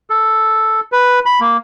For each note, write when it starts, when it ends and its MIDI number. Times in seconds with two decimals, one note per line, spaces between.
0.10 0.81 69
0.92 1.20 71
1.26 1.40 83
1.40 1.57 58